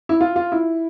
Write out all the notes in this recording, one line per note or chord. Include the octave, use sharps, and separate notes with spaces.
E4
F4
F4
E4